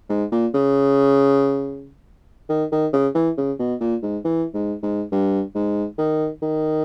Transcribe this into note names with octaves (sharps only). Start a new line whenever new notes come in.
G#2
A#2
C#3
D#3
D#3
C#3
E3
C#3
B2
A#2
G#2
E3
G#2
G#2
G2
G#2
D#3
D#3